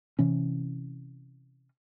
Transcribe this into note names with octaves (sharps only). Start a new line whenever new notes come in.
C3 E3 C#4